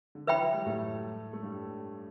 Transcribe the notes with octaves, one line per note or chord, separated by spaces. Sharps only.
D3
E3 B4 E5 G5 B5
F#3
G3
A2 A3
A3
G2 G3